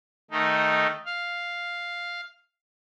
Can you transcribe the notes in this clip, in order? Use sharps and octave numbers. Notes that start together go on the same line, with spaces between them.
D#3 A3 D#4
F5